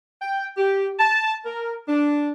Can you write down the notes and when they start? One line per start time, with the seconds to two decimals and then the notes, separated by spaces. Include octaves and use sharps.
0.22 G5
0.58 G4
0.99 A5
1.46 A#4
1.88 D4